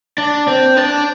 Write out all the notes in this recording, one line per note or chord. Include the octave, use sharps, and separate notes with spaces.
D4
C4
D4